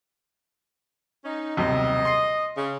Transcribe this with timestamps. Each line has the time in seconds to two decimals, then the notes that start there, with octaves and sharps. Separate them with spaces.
1.25 C#4 D#4
1.57 D#1 B1 C3 D#5
2.05 C6 C7
2.56 C#3